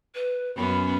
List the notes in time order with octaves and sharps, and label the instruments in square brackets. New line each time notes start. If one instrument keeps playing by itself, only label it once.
[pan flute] B4
[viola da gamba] F#2 B3 C#4 [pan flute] B5